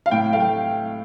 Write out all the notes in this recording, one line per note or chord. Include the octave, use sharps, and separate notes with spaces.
F5
A2 G5
A3 F5
G5